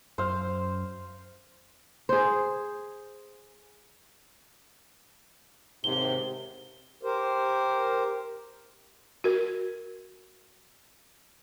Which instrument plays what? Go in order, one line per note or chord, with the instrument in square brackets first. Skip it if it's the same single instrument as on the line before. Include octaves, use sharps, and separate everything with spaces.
[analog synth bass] F#2 [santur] C5 F5
[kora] G#4 C5
[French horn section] D#2 G#2 C3 [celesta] G7
[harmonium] G4 A#4 C5
[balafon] F#4 A#4